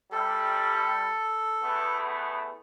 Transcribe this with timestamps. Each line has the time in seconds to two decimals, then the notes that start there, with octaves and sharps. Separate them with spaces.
0.12 C3 G3 A4
1.62 E2 A3 B3